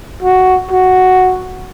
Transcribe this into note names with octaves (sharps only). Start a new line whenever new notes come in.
F#4
F#4